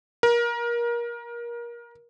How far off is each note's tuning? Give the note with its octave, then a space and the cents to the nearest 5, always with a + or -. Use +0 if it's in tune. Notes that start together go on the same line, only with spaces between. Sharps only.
A#4 +25